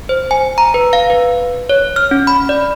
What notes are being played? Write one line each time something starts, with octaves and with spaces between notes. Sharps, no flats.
C5
G#5
A#5
B4
F5
B4
C#5
F6
C#4
B5
D5